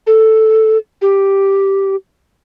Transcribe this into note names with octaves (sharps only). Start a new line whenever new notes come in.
A4
G4